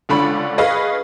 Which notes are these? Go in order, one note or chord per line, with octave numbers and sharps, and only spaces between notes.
C#2 D3 D4 B5 C#6
G#4 B4 D#5 F5 C#6